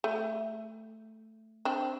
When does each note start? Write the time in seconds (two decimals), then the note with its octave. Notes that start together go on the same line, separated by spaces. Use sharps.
0.04 A3
1.65 C4 D4